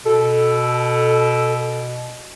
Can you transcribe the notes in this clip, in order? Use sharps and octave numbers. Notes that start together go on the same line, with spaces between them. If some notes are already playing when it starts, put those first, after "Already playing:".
B2 A4